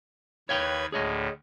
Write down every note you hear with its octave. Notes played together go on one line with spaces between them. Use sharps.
D#2 B4 C#5 F5 G5 G#6
D2 A2 G#4 C#5 D#5